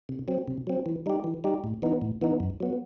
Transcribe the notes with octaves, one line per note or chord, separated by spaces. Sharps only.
C3
F#3 C4
C3
F#3 C4
E3
G3 D#4 G4
E3
G3 D#4 G4
A2
E3 B3 D#4
A2
E3 B3 D#4
F#2
F#3 B3